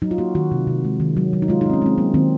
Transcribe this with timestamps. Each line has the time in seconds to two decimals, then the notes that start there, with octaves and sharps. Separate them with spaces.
0.02 F#3 D#4
0.11 F4
0.18 A#3 F#4
0.35 D#3 F#4
0.52 C3
0.67 C3
0.84 G#3
1.00 D#3
1.17 F#3
1.33 F#3
1.42 D#4
1.48 G#3 F4
1.61 D#4
1.66 G#3 C4
1.73 C#4
1.82 G#3 C4
1.98 F#3 A#3
2.14 D#3 C4